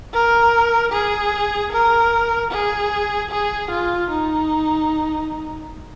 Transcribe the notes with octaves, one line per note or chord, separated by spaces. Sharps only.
A#4
G#4
A#4
G#4
G#4
F4
D#4